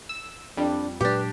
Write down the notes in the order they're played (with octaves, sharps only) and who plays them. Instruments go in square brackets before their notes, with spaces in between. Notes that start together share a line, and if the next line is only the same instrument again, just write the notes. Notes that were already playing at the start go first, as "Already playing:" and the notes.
[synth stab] E6
[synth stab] F2 G3 [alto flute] D4
[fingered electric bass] A#2 F#3 G#3 [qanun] D4 G4 [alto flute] B4